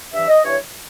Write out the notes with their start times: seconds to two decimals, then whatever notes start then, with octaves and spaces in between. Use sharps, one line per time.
0.13 G2 E3 E5
0.28 D#5
0.44 G2 E3 C#5